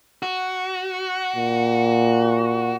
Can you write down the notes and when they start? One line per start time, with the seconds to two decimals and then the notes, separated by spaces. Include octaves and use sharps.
0.23 F#4
1.36 A#2